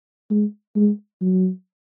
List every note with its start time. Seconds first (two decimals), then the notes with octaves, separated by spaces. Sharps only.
0.31 G#3
0.76 G#3
1.21 F#3